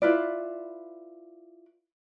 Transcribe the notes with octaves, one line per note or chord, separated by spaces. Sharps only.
E4 F4 B4 D5